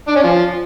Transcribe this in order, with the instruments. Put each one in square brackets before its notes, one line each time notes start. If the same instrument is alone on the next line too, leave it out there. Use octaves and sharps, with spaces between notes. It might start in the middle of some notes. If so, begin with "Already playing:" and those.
[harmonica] D4
C#4
F3